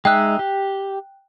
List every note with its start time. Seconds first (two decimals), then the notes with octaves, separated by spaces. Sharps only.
0.05 G#3 D#4 E5 G5 F#6
0.39 G4